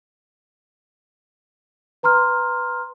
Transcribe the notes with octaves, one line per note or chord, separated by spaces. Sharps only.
B4 A#5 C6 F6